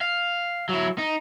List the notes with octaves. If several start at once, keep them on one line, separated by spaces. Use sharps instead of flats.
F5
F#3 E4
D#4